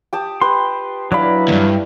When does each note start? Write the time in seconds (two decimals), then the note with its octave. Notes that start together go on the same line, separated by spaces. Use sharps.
0.13 G4 A5 D#6
0.42 G4 B4 C6
1.12 F#3 D4 E4 B4 D5 F5 B5
1.48 D2 G2